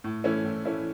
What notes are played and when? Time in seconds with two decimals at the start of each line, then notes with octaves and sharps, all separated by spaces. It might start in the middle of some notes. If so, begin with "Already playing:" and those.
0.04 A2
0.24 E3 A3 C#4 E4
0.44 A2
0.65 E3 A3 C#4 E4